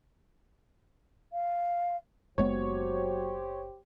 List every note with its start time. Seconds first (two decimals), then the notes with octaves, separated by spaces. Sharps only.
1.32 F5
2.38 F#1 F#3 G#3 B3 G4 C5 C#5